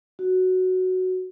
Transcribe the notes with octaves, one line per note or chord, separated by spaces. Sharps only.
F#4